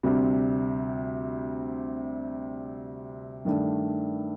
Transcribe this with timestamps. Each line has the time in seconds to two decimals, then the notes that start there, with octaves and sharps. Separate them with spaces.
0.03 D2 C3 G3 C4
3.45 G2 D#3 A3 D4